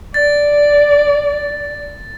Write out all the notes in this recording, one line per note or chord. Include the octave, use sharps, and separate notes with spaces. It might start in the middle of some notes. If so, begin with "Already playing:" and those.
D5 A6